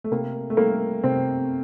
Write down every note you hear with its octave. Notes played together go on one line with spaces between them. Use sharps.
A3
C3 A#3
A3
G3 A#3
C3 C4